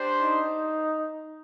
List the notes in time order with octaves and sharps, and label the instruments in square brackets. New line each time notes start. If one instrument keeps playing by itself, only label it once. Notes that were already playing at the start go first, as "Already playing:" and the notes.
Already playing: [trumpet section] D4 G4 C5
[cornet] D#4